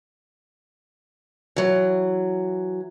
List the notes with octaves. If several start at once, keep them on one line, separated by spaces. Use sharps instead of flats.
E3 F#3